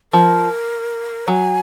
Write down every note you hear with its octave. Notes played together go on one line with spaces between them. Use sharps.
F3 A#4
F#3 G#5